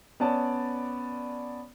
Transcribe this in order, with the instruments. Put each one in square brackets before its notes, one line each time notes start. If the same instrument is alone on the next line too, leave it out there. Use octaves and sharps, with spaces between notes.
[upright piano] B3 C#4 D5 A5